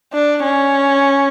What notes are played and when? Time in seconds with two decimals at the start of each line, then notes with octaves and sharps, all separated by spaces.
0.13 D4
0.43 C#4